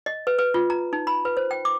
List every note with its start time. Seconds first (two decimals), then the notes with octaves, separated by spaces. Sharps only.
0.06 D#5
0.27 B4
0.39 B4
0.54 F4
0.70 A#5
0.93 D#4
1.07 B5
1.25 B4
1.37 C5
1.51 G5
1.65 D6